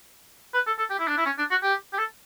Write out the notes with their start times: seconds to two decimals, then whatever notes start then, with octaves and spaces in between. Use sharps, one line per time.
0.54 B4
0.67 A4
0.78 A4
0.90 G4
0.99 E4
1.08 D4
1.17 E4
1.26 C#4
1.38 D4
1.51 F#4
1.63 G4
1.93 G4
1.98 A4